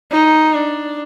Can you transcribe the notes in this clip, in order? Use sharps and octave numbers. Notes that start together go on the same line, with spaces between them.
D#4
D4